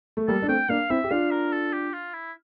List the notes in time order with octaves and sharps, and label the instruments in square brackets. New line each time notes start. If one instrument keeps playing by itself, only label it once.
[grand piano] A3
[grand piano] G3 A#3 [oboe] A4
[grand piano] D4
[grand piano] A3 C4 [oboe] G5
[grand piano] A#3 D4 [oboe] F5
[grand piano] C4 E4 [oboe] E5
[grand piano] G4
[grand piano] D4 F4 [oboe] F5
[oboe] A#4
A4
G4
F4
E4